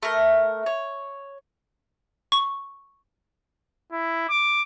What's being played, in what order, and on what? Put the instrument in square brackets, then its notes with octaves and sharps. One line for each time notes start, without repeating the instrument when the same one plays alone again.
[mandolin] A3 A#4
C#5
[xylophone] C#6
[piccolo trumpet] E4
D6